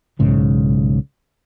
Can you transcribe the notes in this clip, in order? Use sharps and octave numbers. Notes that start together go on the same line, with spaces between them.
B1 G#2 C#3 E3